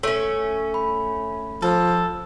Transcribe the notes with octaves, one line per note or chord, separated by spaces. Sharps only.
A3 C#4 C#5
B5
F3 A4